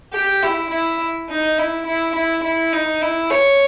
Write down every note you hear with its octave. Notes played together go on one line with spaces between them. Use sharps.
G4
E4
E4
D#4
E4
E4
E4
E4
D#4
E4
C#5